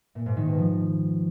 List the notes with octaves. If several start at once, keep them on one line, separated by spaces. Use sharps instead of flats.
A#2
G#2
D#3
B2
F3